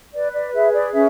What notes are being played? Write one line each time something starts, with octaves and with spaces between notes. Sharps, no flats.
B4 D5
D5
G#4 E5
D5
C#4 E5